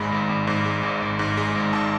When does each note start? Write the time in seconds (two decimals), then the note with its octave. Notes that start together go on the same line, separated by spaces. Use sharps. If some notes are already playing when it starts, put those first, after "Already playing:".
Already playing: G#1 G#2 G#3 B5
0.12 G#1
0.29 G#1
0.47 G#2
0.66 G#3
0.83 G#1
1.02 G#1
1.19 G#2
1.37 G#3
1.56 G#1
1.73 G#1 A5